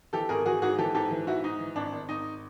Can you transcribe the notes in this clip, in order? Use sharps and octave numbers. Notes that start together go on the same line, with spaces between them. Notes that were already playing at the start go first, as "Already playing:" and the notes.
E3 G4 A4
G#1 G#4 A#4
E3 F#4 G#4
G#2 F#4 G#4
E3 G4 A4
G#2 G4 A4
E3
G#2 E4 F#4
G#2 D#4
E3
G#1 D4
G#1
G#1 D#4